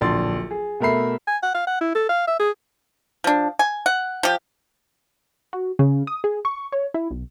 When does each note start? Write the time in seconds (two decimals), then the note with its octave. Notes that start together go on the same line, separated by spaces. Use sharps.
0.01 D1 A#1 D4 C6 A6
0.51 G#4
0.80 B2 A3 A#4 E5 B5 C7
1.27 G#5
1.43 F#5
1.54 F5
1.67 F#5
1.81 E4
1.95 A4
2.09 F5
2.27 E5
2.39 G#4
3.24 F3 D4
3.59 G#5
3.86 F#5
4.23 F3 G4
5.53 F#4
5.79 C#3
6.07 D#6
6.24 G#4
6.45 C#6
6.72 C#5
6.94 E4
7.11 B1